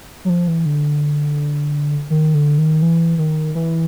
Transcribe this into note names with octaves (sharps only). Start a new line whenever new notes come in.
F#3
F3
E3
D3
D#3
D3
D#3
E3
D#3
E3